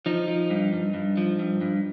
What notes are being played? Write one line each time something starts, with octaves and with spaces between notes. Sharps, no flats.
F3 D#4
F3
G2
G2
G2
F3
G2
G2